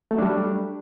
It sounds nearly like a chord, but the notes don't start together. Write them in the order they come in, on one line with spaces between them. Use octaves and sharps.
A3 F#3 D4 G3